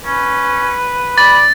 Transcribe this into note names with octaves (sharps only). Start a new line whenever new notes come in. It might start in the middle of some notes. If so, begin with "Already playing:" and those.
C#4 B4
D5 B5 A6